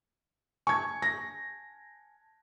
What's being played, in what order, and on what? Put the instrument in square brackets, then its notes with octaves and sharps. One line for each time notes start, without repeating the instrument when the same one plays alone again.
[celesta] G#5 A5 [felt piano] C#6 G#6
[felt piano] A#6